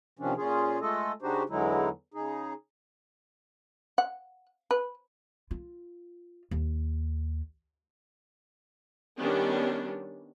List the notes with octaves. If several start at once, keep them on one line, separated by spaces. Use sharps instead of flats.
C3 D#3 F3 C#4 D4
A#2 C#4 F4 G#4
G#3 A3 F4 A4 D#5
C#3 D4 D#4 F#4 G4 C5
E2 D3 F#3 G#3 D#4 E4
C#3 D#4 G#4
F#5
B4
F4
D#2
D#3 G3 B3 C#4 D4